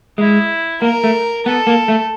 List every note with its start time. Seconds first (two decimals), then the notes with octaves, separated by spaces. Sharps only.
0.18 G#3 E4
0.82 A#3 A#4
1.04 A3
1.46 B3 A4
1.67 A#3
1.88 A3